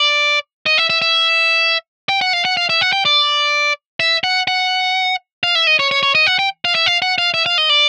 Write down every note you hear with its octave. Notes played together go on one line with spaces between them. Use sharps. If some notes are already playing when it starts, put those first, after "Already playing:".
Already playing: D5
D#5
E5
E5
E5
G5
F#5
F5
F#5
F5
E5
F#5
G5
D5
E5
F#5
F#5
F5
E5
D#5
C#5
C#5
C#5
D#5
F#5
G5
F5
E5
F5
F#5
F5
E5
F5
D#5
D5